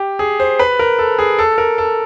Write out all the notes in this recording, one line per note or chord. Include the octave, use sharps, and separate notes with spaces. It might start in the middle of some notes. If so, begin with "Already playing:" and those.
Already playing: G4
G#4
C5
B4
A#4
A4
G#4
A4
A#4
A4